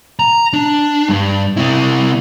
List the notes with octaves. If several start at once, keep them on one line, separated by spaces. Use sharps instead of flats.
A#5
D4
G2
C3 E4